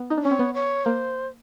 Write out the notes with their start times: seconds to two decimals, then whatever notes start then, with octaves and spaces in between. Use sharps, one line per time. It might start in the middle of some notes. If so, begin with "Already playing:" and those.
Already playing: B3
0.10 D#4
0.17 D4
0.23 C#4 C#5
0.31 C4
0.39 B3
0.54 C#5
0.85 A#3 C5